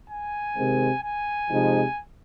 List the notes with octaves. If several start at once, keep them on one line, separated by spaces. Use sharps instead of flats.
G#5
C3 D#3 G#3 C4
G#5
C3 F3 G#3 D#4